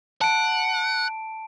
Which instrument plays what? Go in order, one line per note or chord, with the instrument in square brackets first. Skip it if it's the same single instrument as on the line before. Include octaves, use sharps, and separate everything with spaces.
[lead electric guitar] F#5 [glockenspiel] A5 D7